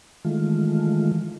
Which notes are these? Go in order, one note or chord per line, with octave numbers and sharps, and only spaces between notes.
D#3 E3 G#3 A3 F4